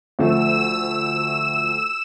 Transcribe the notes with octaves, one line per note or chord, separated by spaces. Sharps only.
D2 F3 A3 E6 E7